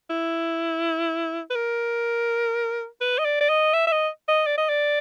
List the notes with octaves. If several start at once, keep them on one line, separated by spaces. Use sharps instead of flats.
E4
B4
A#4
B4
D#5
D5
D5
D#5
E5
E5
D#5
D#5
D5
D#5
D5